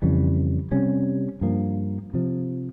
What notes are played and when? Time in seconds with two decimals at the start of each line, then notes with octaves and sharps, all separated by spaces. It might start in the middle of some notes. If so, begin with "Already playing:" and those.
0.02 F2 C#3 E3 G3
0.71 C3 G3 C#4
1.41 G2 F3 A#3
2.14 C3 F3